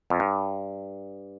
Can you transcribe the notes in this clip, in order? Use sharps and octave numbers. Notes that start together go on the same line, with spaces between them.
F2
G2